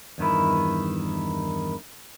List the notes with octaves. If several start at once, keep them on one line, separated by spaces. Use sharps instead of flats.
E2 G2 D#3 E4